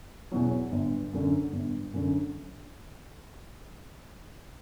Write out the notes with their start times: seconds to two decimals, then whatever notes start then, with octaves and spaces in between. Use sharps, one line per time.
0.31 E2 B2 F#3
0.72 G1
1.13 F#2 D3
1.53 G1
1.94 F#2 D3